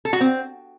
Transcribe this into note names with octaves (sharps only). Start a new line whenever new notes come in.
A4
F#4
C4